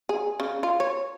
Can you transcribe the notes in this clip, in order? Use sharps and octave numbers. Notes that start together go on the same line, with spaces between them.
G#4
C#3
F4
C#5